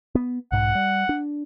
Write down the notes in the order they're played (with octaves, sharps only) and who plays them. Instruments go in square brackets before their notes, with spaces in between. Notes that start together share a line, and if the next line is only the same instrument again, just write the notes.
[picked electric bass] B3
[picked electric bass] B1 G#2 [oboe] F#5
[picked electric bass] G3
D4